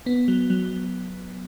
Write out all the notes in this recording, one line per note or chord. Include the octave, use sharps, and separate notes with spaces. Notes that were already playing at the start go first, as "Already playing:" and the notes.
B3
F#3
F#3